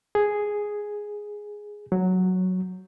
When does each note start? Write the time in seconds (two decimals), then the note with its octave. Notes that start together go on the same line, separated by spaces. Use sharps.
0.15 G#4
1.92 F#3